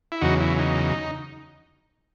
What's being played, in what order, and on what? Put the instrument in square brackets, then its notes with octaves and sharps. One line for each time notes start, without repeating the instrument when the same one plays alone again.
[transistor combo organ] E4
E2 C#3 F#3 D#4 F#4
E4
D#4